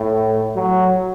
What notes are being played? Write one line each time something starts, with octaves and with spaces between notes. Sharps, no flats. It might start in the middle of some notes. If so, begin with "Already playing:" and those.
Already playing: A2
F#3